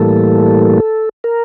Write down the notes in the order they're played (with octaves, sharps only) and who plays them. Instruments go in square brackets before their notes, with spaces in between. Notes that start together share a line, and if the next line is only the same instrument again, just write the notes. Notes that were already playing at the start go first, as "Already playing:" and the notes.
Already playing: [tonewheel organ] A2 E3 G3 A#3 A4
A#4